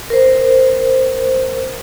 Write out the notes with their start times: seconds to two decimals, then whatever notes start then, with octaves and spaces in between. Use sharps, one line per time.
0.10 A#4 C5